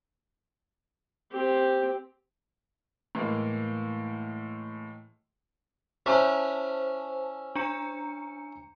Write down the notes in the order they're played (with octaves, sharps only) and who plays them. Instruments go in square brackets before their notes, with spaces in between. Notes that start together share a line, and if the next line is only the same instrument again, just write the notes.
[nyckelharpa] C4 G4
[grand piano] A2 E3 G#3 A#3
[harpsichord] C#4 E4 [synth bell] C5 A5
[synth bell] D4 A#5 C#7